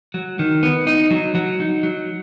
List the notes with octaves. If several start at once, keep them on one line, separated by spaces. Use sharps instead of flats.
F#3
D#3
B3
D#4
F#3
F#3
D#4
F#3